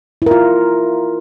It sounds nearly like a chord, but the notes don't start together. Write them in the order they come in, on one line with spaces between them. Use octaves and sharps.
E4 A#4 F4